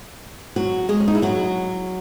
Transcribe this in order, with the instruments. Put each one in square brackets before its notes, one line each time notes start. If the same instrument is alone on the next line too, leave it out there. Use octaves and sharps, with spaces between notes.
[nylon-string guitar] F#3 F#4
G#3 G#4
C#4
D#4
E4
F#3 F#4